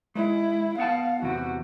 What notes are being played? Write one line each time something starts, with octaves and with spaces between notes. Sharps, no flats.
G#3 E4
B3 F5 F#5 A5
E2 C3 F#4